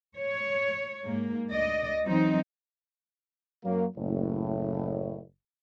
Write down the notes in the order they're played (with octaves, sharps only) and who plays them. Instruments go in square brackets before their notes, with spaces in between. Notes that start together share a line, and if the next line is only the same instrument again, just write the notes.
[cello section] C#5
G#2 A#3
D2 D5 D#5
E3 F#3 C4 D#4
[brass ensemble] F#2 F#3 A#3
F#1 A2